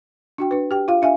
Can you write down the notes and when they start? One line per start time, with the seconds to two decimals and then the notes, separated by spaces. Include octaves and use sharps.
0.38 D4 F#4 G5
0.51 D4 B4
0.71 G4 G5
0.88 F4 F5
1.02 D4 E5 F5 G#5